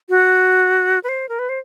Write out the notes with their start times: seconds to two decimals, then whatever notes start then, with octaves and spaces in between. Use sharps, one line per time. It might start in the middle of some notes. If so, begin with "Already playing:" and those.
0.09 F#4
1.04 B4
1.09 C5
1.29 A#4
1.39 B4
1.49 C5